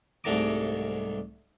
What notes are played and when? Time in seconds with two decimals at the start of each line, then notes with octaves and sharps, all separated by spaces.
0.24 C2 G#2 A3 D4 A#5 D6